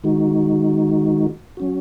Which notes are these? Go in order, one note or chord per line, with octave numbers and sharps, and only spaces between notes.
D#3 G#3 D#4 F#4
F#3 C#4 F#4